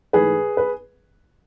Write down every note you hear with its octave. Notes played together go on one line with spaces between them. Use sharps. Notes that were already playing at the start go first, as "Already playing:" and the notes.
G#2 E3 A3 G#4 B4
B4